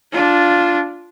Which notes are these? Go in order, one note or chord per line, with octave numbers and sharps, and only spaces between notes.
D4 F4